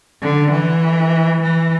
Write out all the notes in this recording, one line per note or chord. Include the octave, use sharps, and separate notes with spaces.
D3
E3
E3